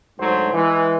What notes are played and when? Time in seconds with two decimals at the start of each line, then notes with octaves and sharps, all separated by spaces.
0.19 D2 G#2 F#3 C5
0.52 E3 G#3